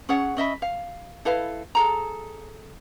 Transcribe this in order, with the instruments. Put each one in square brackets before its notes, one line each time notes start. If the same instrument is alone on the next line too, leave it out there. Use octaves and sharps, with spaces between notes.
[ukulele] C#4 G#4 C#5 F#5
C#4 D#5 E5 B5
F5
E4 A4 B4 F5
G#4 A4 A#5